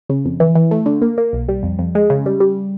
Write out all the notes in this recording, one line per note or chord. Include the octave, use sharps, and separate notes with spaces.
C#3
F2
E3
E3
A3
D3
A#3
A#3
B1
G3
F2
F2
G#3
C#3
G3
G3